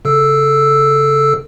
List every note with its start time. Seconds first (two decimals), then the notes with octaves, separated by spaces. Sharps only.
0.05 C#3 A4 E6